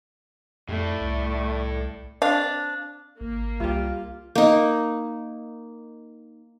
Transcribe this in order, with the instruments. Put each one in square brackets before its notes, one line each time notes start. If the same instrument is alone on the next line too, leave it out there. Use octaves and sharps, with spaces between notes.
[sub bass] F2 [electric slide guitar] A2 [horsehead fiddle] A3 D5
[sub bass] C2
[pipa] C4 D4 F5
[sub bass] G#1 [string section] A#3
[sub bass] C2 [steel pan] G3 G4 [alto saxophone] F4
[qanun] A#3 D#4